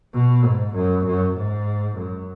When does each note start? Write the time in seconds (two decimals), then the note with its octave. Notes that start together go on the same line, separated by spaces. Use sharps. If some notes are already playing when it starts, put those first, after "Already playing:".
0.14 B2
0.45 G#2
0.75 F#2
1.06 F#2
1.37 G#2
1.98 F#2